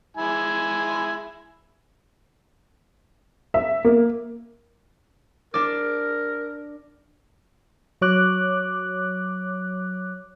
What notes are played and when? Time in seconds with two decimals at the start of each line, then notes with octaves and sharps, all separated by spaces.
0.17 G#3 E4 G#5
3.54 E5
3.84 A#3
5.54 D4 A#4 D5
8.02 F#3 C#5 D6 F#6